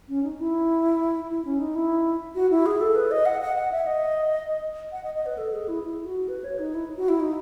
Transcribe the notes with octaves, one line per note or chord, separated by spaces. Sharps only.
C#4
D#4
E4
E4
C#4
D#4
E4
F#4
E4
G#4
A4
B4
D#5
F#5
F#5
F#5
E5
D#5
F#5
D#5
D#5
B4
A4
G#4
E4
E4
F#4
B4
C#5
D#4
E4
F#4
E4
D#4